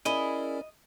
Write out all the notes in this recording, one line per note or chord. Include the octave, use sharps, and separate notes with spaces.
C#4 E4 G#4 A#4 D5 D#5